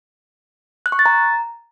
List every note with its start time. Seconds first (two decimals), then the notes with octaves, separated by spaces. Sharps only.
0.86 F#6
0.92 C#6
0.99 A6
1.06 A#5